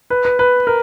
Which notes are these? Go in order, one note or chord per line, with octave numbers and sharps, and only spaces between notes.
B4
B4
B4
A#4